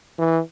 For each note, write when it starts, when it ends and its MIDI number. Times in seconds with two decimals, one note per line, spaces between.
0.18 0.39 52